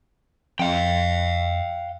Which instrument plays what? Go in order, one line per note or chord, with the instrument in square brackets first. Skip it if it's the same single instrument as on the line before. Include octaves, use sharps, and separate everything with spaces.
[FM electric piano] F2 [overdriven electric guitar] F5 G5